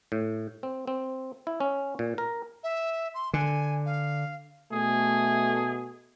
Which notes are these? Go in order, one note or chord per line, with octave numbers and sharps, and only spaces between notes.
A2
C4
C4
E4
C#4
A#2
A#4
E5
C6
D3 G#5
F5
B2 A3 G#4